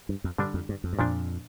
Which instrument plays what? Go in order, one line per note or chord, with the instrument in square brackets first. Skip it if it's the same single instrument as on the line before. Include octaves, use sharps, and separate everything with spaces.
[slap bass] G2
F2
[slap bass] G2 [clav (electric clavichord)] D3 G3 D4
[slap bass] F2
G2
F2
G2
[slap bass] F2 [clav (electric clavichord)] A#2 F3 D4